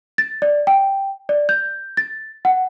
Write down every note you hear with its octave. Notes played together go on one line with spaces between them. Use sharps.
A6
D5
G5
D5
G6
A6
F#5